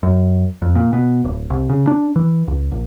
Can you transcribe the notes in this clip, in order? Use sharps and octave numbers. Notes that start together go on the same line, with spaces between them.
F#2
F2
A#2
B2
D1
C2
C#3
D4
E3
C#2
A#1